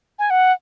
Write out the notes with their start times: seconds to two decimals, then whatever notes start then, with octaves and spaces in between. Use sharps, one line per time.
0.19 G#5
0.30 F#5